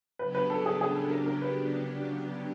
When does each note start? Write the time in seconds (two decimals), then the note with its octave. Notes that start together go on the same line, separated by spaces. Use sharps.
0.19 C#3 F#3 B3 D4 G4 B4
0.35 B4
0.50 A4
0.66 G#4
0.81 G#4
0.95 A4
1.11 A#4
1.26 A#4
1.42 B4